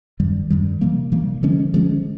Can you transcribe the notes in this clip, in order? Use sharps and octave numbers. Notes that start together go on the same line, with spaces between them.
F#2 D#3 G3
F#2 D#3 G3
C3 E3 G3 A#3
C3 E3 G3 A#3
D3 F3 G#3 C#4
D3 F3 G#3 C#4